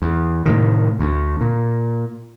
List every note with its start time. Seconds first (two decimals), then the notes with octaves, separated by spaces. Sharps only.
0.02 E2
0.46 A2 C3 D#3
0.99 D2
1.41 A#2